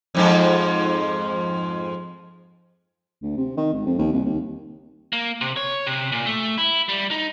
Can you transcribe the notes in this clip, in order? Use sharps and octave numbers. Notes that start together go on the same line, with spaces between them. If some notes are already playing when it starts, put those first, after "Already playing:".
F2 G#2 F3
D2
C3
D#3
G#1
F2
D#2
C2
D#2
A#3
C3
C#5
C3
A#2
A3
E4
G3
D#4